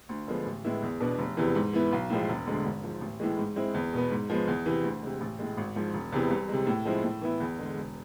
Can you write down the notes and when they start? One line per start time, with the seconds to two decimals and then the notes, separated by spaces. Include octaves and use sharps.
0.09 D2
0.27 D3 F3 G#3 B3
0.46 A1
0.64 A2 G#3 B3 E4
0.83 E2
1.00 B2 B3 D4
1.19 F1
1.37 E2 C3 E3
1.55 G#2
1.73 E3 B3 E4
1.92 B1
2.10 A2 F3 G#3
2.29 E1
2.47 D2 D3 G#3
2.65 G#1
2.84 G#2 F3
3.01 A1
3.20 A2 E3 G#3
3.38 G#2
3.56 G#3 C4 E4
3.74 E2
3.93 B2 B3
4.11 G#2
4.29 F3 G#3 B3
4.47 E2
4.66 C3 E3
4.84 D2
5.03 C3 G#3
5.21 A1
5.39 A2 G#3
5.57 G#1
5.76 G#2 F3
5.94 E1
6.12 E2 C3 E3
6.30 C2
6.49 C3 G#3
6.67 A2
6.85 F3 G#3 C4 E4
7.03 A2
7.21 E3 B3 E4
7.40 E2
7.58 D3 G#3
7.76 E1